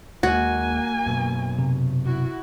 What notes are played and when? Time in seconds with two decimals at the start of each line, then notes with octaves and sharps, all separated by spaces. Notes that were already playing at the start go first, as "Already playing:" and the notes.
0.23 D#2 G#3 A#3 F#4 G#5
1.06 F#2 B2
1.59 C3
2.05 E4 F#4